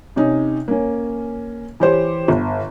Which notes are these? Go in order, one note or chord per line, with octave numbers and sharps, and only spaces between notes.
C3 C#4 D#4
A#3 C#4
E3 G4 C5 C#5
G1